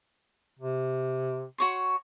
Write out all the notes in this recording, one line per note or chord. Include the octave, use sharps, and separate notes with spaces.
C3
F#4 C#5 C6